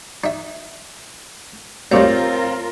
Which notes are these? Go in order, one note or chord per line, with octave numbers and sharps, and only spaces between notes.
D#4 E5
D2 A2 G3 C4 F4 A#4 C#5 F5